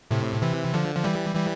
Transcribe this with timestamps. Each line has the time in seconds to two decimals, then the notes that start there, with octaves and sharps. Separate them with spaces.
0.11 A2 C3
0.42 C3 E3
0.74 D3 F3
0.95 F3
1.04 E3 G3
1.35 E3 G3